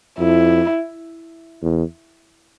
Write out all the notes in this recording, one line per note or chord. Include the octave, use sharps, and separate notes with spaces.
F2 E4
E2